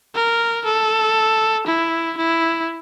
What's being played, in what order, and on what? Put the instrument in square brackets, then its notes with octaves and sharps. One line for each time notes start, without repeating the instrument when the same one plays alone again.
[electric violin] A#4
A4
E4
E4